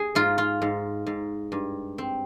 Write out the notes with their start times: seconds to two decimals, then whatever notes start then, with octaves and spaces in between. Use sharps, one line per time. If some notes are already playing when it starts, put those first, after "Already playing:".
Already playing: G#4
0.15 G#2 F4
0.38 F4
0.62 G#2
1.06 G#2
1.52 G2
1.98 C4